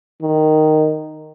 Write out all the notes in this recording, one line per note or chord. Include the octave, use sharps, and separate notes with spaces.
D#3